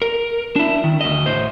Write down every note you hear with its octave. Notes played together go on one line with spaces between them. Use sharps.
A#4
D4 E4
D#3
D2 D#5
A2 C5